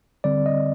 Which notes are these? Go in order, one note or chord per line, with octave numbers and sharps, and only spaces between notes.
D3 G3 C4 D5
D#5